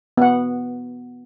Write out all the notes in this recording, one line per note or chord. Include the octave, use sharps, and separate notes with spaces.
B3 F#5